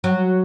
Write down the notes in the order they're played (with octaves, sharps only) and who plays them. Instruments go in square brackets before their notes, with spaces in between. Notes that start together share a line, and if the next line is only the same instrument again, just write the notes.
[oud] F#3